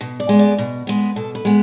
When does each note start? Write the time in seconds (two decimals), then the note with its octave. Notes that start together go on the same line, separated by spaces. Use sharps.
0.01 B2
0.20 D5
0.29 G#3 B3
0.39 D5
0.58 B2
0.87 G#3 B3
1.16 B2 A4
1.35 B4
1.45 G#3 B3